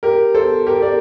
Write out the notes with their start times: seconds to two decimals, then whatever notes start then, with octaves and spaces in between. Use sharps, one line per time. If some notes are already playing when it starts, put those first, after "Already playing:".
0.03 G4 A#4
0.34 A4 C5
0.66 G4 A#4
0.82 A#4 D5